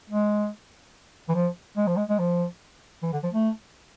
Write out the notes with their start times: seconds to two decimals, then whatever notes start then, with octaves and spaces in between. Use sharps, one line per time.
0.10 G#3
1.29 E3
1.35 F3
1.77 G#3
1.87 F3
1.97 G#3
2.09 G#3
2.19 F3
3.03 E3
3.13 D3
3.23 F3
3.34 A3